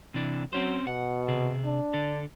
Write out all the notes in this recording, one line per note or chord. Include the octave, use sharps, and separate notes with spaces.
C3 E3 D4
F#3 C4 C#4 C5
B2 F#5
C3 G#4
D4
D3 A4